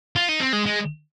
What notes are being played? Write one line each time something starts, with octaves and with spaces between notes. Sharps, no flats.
F4
D#4
C4
G#3
G#3